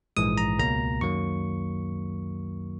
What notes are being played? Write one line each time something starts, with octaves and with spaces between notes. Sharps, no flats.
A#1 G#2 E3 G#3 D#6
A#5
C#2 B2 A#3 A#5
F#2 D#3 F#3 A#3 C#6